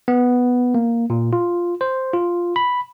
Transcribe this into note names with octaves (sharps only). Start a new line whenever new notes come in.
B3
A#3
A#2
F4
C5
F4
B5